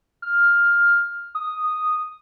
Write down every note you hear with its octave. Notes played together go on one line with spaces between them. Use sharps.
F6
D#6